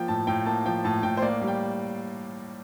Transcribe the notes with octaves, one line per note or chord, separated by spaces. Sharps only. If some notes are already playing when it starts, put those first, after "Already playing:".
Already playing: F3 A#3 G5
A2 A5
A2 G5
A#3 A5
F3 G5
A2 A5
A2 G5
C5
A#3 D5
G3
G5